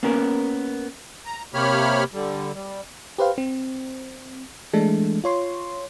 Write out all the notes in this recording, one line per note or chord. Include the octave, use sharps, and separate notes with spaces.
A#3 B3 C#4 A#4
A#5
C3 A#3 G4 C#5 B5 F6
D3 G3
G3
G4 B4 C5 F5
C4
E3 G#3 A3 D4 A4
F4 C#5 C6